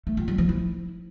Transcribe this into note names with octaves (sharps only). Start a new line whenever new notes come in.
A3
F4
G3
F3
E4